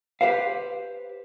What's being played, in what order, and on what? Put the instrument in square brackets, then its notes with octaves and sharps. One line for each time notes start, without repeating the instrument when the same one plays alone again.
[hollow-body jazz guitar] G4 B4 C5 F5